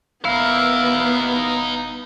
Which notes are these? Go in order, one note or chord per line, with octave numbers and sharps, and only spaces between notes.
D#1 B3 D#4 E4 A#4 F5